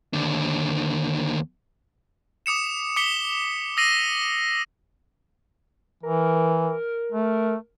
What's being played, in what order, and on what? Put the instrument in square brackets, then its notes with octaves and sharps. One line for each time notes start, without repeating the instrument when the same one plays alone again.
[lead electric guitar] D#2 D3
[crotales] D6 D#6 C#7 E7
D6 B6 C#7 G7
D#6 E6 A#6 C7 D#7 F#7
[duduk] E3 [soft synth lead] A#4
[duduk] A3